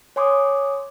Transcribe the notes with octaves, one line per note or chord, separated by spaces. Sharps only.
C#5 G#5 C6 D6 D#6